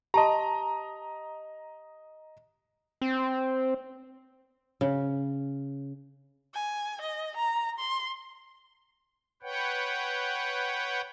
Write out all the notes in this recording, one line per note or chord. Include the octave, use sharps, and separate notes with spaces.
G4 D#5 A5 A#5 C6
C4
C#3
G#5
D#5
A#5
C6
B4 C#5 F#5 G5